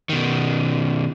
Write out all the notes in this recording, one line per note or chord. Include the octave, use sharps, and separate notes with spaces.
B2 D#3